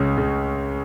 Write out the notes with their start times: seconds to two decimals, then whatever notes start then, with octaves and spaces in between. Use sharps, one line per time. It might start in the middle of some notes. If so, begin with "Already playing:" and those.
Already playing: C#2 C#3 C#4
0.18 C#3